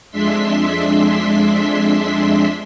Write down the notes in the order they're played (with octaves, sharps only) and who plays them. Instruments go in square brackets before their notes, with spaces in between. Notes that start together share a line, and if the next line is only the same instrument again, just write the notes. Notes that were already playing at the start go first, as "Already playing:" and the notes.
[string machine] F2 G#3 D4 E5 C6 B6